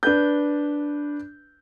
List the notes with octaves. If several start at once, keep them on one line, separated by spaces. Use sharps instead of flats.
D4 B4 G6